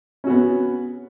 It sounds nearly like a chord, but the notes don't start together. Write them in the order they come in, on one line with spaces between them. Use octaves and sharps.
C#4 F#4 B3